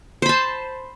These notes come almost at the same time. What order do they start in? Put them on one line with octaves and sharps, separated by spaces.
C5 B5 A5